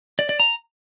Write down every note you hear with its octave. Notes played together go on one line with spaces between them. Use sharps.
D5
D5
A#5